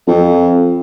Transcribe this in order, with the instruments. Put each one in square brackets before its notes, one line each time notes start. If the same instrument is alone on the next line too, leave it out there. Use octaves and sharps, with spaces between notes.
[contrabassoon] F2